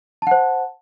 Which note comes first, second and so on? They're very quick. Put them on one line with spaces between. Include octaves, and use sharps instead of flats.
A5 F#5 C5